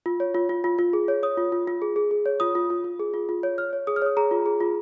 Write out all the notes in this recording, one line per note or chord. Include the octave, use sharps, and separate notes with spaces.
F4
C#5
F4
F4
F4
F4
G#4
C#5
C#5 D#6
F4
F4
F4
G#4
G#4
G#4
C#5
F4 D#6
F4
F4
F4
G#4
F4
F4
C#5
C#5 F6
C#5
G#4 D#6
F6
C#5 D#6
G#4 A#5
F4
G#4
F4